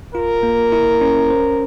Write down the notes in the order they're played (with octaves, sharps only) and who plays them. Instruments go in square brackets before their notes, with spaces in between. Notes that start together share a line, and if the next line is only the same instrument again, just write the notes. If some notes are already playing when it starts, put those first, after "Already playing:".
[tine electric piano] F4 [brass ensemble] A#4
[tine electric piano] A#3
E4
C#4
C5